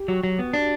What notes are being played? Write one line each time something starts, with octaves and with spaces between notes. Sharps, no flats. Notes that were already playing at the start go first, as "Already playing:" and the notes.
Already playing: G4
F#3 F#4
F#3
B3
D4